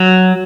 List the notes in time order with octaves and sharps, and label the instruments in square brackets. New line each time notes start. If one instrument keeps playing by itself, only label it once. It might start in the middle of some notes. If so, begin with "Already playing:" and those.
Already playing: [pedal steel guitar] F#3